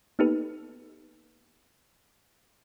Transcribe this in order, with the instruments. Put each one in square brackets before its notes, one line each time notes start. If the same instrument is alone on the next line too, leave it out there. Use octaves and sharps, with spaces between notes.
[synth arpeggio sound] A#3 B3 D#4 G4 A4 B4